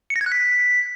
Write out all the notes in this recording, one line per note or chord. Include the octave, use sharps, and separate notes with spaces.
C#7
A#6
G#6
F#6
B6